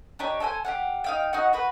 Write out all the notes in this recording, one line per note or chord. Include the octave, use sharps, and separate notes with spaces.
D4 D#4 G4 C#5
A4 C5 F#5 G#5
G4 F5 F#5
D#4 F5 G5
D#4 F#4 F#5
F#4 B4